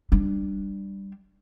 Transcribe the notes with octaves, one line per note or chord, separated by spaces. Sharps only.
G3 D4